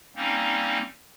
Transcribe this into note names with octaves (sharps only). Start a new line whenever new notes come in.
G3 A#3 C4 C#4 D#4